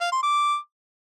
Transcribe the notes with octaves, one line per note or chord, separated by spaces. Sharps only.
F5
C6
D6